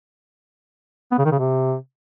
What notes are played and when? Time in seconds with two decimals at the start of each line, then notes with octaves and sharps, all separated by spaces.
1.12 B3
1.18 C#3
1.25 D#3
1.32 C#3
1.39 C3